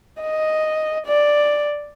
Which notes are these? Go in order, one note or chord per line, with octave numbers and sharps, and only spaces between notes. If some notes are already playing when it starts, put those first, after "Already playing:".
D#5
D5